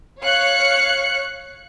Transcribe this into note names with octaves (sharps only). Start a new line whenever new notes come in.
C#5 F5 F#6 C#7